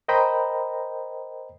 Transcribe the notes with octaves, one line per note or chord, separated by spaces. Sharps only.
A#4 C5 D#5 G5 A#5 B5